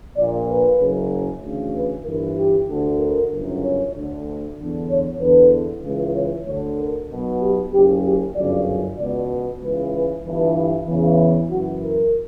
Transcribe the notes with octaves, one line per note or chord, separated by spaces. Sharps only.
A#1 A#2 D5
B4
F#1 F#2 C#3
D2 C#3 E3
B4
G1 G2 E3 A#4
G4
D2 D3
A#4
G1 F#2 C#3
C#5
D2 D3
E2 D3
C#5
E2 D3 B4
C#2 C#3 E3
C#5
D2 D3 C#5
A#4
B1 B2
G4
F#1 F#2 C#3 G4
G4
G1 F#2 C#3 D5
C#2 B2 D5
C#2 C#3 E3 B4
B4
G1 G2 E3
E2 C#3 E3
F#1 F#2 E3 F#4
A#4